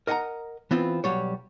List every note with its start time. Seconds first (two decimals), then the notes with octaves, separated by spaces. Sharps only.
0.07 A#4 D#5 F#5 G#5 A#5
0.71 E3 B3 C4 F4
1.04 B1 F#3 G3 C#5